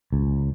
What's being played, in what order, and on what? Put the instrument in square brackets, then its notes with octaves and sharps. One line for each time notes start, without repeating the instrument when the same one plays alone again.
[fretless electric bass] C#2